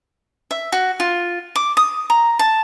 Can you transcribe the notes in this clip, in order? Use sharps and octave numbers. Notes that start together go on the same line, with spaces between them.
E5
F#4
F4
D6
D#6
A#5
A5